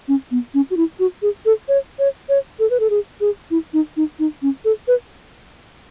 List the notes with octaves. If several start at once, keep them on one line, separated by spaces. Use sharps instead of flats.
C#4
B3
C#4
F#4
E4
F#4
G#4
A4
C#5
C#5
C#5
A4
B4
A4
G#4
G#4
E4
D#4
D#4
D#4
C#4
A4
B4